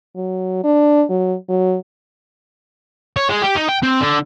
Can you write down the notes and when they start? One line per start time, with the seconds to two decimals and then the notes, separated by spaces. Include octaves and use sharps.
0.16 F#3
0.64 D4
1.10 F#3
1.49 F#3
3.16 C#5
3.29 G#3
3.42 G4
3.55 D#4
3.68 G5
3.83 C4
4.01 D3